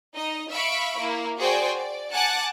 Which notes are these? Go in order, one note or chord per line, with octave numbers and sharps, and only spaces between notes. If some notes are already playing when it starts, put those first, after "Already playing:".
D#4 D#5
E5 F5 B5 C#6 D7
A#3 E4
F#4 G#4 C5 D5 G5 G#5
D5
F#5 G#5 A5 D6 F#6